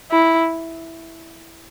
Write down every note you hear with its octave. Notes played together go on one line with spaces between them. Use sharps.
E4